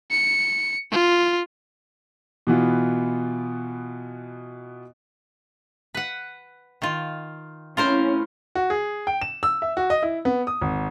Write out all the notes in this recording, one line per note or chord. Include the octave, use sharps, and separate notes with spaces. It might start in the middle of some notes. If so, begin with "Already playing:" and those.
C#7
F4
B2 E3 B3 F4
B4 F#5
D#3 F4
A2 C3 C#4 E4 F4 A#4 C5
F#4
G#4
G5
E7
E6
E5
F#4
D#5
E4
B3
D#6
G#1